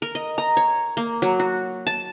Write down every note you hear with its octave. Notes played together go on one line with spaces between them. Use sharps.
A#4
D#5
A#5
C#5
A#3
F#3
F#4
A5